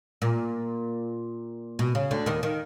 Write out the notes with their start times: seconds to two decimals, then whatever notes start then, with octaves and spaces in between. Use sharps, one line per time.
0.22 A#2
1.79 B2
1.95 C#3
2.11 D2 D3
2.26 D#2 D#3
2.43 D#3